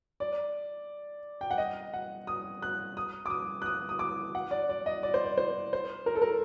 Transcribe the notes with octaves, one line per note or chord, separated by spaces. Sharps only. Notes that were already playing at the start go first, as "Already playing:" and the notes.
D5
G5
F#5
D#5
F#5
D#6
F#6
D#6
D6
D#6
F#6
D#6
D#6
D6
F#5
D5
D5
D#5
D5
C5
D5
C5
C5
A#4
A4
A#4